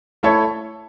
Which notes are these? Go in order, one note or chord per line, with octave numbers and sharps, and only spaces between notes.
A3 E4 A4 C#5